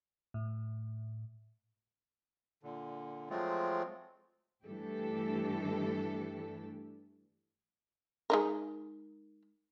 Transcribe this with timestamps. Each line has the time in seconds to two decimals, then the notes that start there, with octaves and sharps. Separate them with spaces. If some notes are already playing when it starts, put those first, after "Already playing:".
0.34 A2
2.63 A#2 D3
3.30 F3 F#3 G#3 A3 C4 F4
4.66 G2 E3 A3 D4 G4 A4
8.30 G#3 D#4 A#4